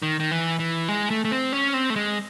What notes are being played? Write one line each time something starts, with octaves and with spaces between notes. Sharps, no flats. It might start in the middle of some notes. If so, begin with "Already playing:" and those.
D#3
D#3
E3
E3
G#3
A3
A3
C4
C#4
C4
A3
G#3